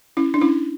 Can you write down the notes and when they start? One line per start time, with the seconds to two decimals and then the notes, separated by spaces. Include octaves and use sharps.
0.17 C#4 E4
0.34 D4
0.41 C#4 E4